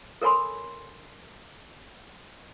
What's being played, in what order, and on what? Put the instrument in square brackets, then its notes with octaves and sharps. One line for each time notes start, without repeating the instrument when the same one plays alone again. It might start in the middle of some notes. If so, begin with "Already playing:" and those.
[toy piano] A4 A#4 C#5 G#5 B5 C6